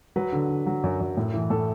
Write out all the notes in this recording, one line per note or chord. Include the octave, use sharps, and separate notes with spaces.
F#3 B4
D3
D3
F#3
F#2
F#2
A2
E3
A2 A4